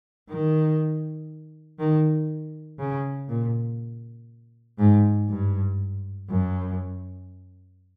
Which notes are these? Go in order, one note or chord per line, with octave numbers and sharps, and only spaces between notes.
D#3
D#3
C#3
A#2
G#2
G2
F#2